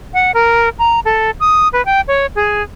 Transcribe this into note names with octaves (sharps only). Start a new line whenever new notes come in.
F#5
A#4
A#5
A4
D#6
B4
G5
C#5
G#4